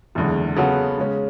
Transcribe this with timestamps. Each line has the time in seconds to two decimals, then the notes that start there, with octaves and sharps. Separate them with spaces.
0.15 F#1 E2 D3 G#3
0.56 C#3 F#3 B3 F#4 A4
0.98 C#3 G#3 C#4